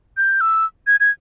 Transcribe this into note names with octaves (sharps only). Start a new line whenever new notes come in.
G6
E6
G#6
G#6